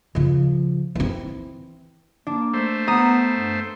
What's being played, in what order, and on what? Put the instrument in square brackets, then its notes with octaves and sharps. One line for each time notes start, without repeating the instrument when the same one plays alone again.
[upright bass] C#3 F3
E3 C4
[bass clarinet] A#3 [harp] D4
[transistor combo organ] A3 C5
[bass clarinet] B3 [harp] A#5 D#6
[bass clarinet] G2